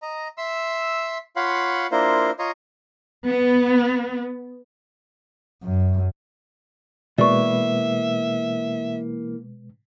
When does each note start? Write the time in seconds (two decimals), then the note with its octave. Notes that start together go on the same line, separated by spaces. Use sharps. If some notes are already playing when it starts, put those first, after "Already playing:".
0.02 D#5 A#5
0.38 E5 C6 E6
1.36 F4 C#5 F5 F#5 B5 C6
1.91 A#3 D4 E4 F4 A#4 C5
2.39 F4 C#5 D#5 A#5 C6
3.26 B3
5.64 F#2
7.18 B2 E3 G#3 A#3 B4 D5 E5 C#6